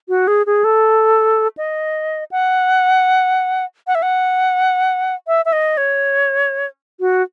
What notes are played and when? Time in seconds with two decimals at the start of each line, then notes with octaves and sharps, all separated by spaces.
0.09 F#4
0.27 G#4
0.46 G#4
0.64 A4
1.57 D#5
2.31 F#5
3.87 F#5
3.95 E5
4.02 F#5
5.27 E5
5.45 E5
5.52 D#5
5.77 C#5
7.00 F#4